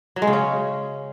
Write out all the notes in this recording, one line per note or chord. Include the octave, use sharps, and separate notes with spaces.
F#3
G#3
C#3
C#4